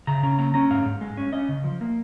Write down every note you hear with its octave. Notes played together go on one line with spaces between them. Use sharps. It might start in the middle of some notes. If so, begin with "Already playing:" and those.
C#3 A#5
C#3 A#5
A#3 A#5
C#4 A#5
G#2 F5
G#2
G#3
C#4
C#4 D#5
C#3
F3
A#3